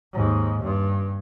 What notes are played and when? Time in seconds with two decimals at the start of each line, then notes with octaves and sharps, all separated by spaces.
0.13 D#2 G#2
0.63 G2